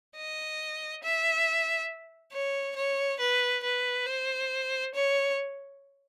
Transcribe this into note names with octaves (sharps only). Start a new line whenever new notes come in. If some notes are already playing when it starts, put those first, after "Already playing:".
D#5
E5
C#5
C#5
B4
B4
C5
C#5